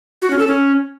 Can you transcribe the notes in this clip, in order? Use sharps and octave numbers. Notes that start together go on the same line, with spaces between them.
F#4
C#4
A4
C#4